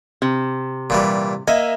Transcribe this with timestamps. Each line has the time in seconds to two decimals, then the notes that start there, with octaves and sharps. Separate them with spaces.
0.22 C3
0.90 A#2 E3 G3
1.48 A#3 D#5 E5 G#5